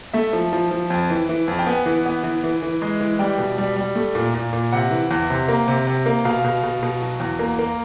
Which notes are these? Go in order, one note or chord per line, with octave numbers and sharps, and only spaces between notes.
A3 E5
F3
F3
F3
F2
E3
E3
F2
G5
B3 G#5
E3
B3
E3
E3
E3
G#3
E3
G3 G5
B2
G3
G3
A3
A#2
A#2
A#2
C3 F#5
E3
E2
C3
A#3
C3
C3
A#3
B2 F5
B2
B2
B2
F#3
E2
A#3
A#3